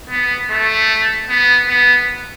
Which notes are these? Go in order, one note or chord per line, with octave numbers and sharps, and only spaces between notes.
B3
A3
B3
B3